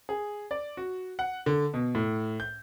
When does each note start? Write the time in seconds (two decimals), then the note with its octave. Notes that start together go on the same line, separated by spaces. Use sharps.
0.09 G#4
0.51 D5
0.77 F#4
1.19 F#5
1.46 D3
1.74 B2
1.95 A2
2.40 G6